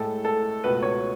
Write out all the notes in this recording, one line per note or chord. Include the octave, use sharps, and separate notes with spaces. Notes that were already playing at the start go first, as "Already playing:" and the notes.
Already playing: A2 G#3 A4
A4
C#2 B2 A3 B4
C#5